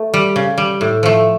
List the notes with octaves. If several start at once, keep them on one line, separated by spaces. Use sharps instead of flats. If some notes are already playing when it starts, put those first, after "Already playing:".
Already playing: A3
G3
C#3
G3
A2
F3 A3